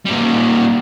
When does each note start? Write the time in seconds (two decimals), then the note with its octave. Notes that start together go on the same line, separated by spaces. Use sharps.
0.05 A#2 G3